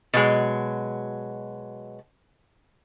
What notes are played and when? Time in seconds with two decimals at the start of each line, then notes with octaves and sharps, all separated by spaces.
0.14 B2 F#3 G#3